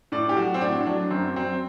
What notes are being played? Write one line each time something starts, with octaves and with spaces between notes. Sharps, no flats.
A2 D5
G4
F#3 F#4
C4
A2 D4
F#3 D4
F#2 C4
F#3 C4